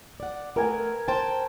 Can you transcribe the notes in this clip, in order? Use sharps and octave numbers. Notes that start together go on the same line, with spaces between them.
D5 F#5
A3 B3 A#4 G#5
C5 G5 A5